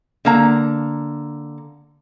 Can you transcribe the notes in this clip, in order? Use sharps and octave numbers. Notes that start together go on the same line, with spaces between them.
D3 A#3 A#5